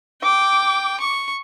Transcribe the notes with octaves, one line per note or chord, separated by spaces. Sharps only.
G5 D6
C#6